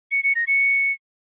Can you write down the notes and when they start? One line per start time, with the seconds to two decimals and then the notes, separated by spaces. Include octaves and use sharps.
0.11 C#7
0.23 C#7
0.35 A#6
0.47 C#7